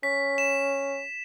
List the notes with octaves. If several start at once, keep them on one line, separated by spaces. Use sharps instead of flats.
C#4 B6
E7